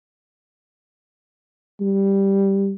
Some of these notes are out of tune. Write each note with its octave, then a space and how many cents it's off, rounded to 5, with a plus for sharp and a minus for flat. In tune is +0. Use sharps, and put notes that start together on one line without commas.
G3 +0